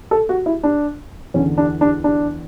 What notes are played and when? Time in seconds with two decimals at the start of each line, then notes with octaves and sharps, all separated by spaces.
0.11 A4
0.29 F#4
0.46 E4
0.63 D4
1.34 E2 C#4
1.39 D3
1.58 D4
1.81 D4
2.04 D4